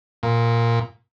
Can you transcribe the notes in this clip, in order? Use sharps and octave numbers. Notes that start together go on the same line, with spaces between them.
A#2